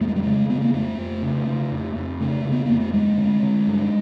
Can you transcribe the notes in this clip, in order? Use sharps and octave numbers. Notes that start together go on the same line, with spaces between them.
F2 A3
G#3
G3
C#3 G#3
C#3 B3
A#3
F2 A3
F2
C#3
C#3
F2
F2
C#3 A3
C#3
B3
F2 A#3
A3
G2 G#3
D3
D3
G2